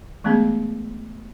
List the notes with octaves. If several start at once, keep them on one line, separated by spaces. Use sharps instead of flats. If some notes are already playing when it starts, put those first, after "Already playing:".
E3 G#3 A3 B3 C#4 G#4